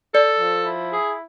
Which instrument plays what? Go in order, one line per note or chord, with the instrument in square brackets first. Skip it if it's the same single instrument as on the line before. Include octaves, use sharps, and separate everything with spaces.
[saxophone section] A4 [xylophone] D5
[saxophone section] F3
E4
G#4